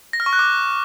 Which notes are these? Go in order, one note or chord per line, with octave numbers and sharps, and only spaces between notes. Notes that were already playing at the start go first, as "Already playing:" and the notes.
A#6
F6
C#6
F#6
D6